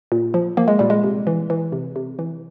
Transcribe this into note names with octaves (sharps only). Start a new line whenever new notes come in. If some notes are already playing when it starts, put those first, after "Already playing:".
A#2
F3
F3 A#3
G#3
A#2 G3
G#3
C3
E3
E3
C3
C3
E3